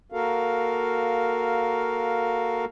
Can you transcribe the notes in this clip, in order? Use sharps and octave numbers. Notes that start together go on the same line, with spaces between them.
A#3 F#4 A4 A#4 F5